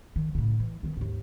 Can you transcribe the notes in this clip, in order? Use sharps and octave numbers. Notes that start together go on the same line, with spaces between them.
D#3
A2 C#3
E3
D#3 B3
D#2 G#2